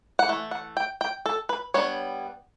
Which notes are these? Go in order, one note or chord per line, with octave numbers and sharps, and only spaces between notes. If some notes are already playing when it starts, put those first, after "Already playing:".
F#5
E3 A3
F#5
G5
G5
A4
B4
G3 B3 D4 C#5